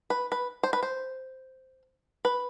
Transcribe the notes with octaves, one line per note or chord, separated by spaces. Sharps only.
B4
B4
C5
B4
C5
B4